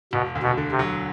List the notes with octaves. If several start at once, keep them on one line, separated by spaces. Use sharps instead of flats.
E1 B2
D2
B2
D3
C3
F#3